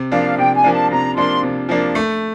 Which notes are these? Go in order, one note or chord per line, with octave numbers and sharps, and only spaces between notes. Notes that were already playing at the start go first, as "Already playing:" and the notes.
Already playing: C3
F3 A#3 D4 F5
C3 G5
G#5
F3 A#3 D4
A5
C3 A#5
F3 A#3 D4 C6
C3
F3 A#3 D4
A3